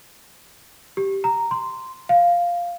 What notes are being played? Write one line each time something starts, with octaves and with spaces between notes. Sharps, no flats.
G4
A#5
C6
F5